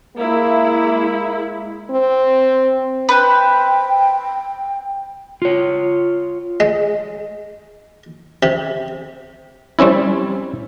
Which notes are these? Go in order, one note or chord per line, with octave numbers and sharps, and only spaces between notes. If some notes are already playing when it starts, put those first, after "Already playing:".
G#3 A#3 E4
C4
B4 C5 G5
F4 C#5
G#3
C3
G3 C4 C#4 E4